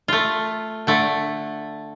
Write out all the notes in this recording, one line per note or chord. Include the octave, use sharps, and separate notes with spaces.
A3 F4
D3 A3